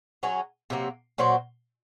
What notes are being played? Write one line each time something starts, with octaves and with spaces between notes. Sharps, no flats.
F#3 C#4 G#4
C3 F#3 A#3
A#2 F#3 C4 F#4